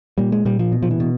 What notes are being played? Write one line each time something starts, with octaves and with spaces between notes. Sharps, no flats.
A#2 G3
G#3
A#2 G3
F3
B2
F3
E3
B2